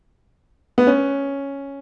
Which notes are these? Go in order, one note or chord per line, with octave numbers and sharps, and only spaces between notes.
B3
C#4